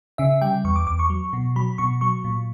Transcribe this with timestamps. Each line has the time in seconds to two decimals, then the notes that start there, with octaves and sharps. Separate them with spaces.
0.18 C#3 E5
0.41 G3 G5
0.64 E2 C#6
0.76 D6
0.87 E2 D6
0.99 C#6
1.10 F#3
1.33 B2
1.56 F#3 B5
1.78 B2 C#6
2.01 F#3 C#6
2.24 A#2